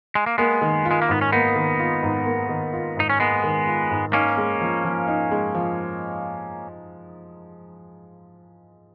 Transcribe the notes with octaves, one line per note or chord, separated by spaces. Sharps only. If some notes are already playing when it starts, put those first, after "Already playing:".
G#3
A#3
G#3 A#3 B3
D#3
F4
G#3
A#3
G#2 B3
C#4
A#3 B3 D#4
D#3
F4
G#2
A#3
D#3
F4
G#2 D#4
C#4
G#3 A#3 B3
D#3
F4
G#2
A#3 C#4 D#4
G#3
F3
F3
D#4
G#3
F3